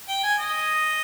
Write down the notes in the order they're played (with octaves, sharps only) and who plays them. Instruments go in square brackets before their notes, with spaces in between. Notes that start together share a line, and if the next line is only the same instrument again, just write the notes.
[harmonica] G5
G#5
D#5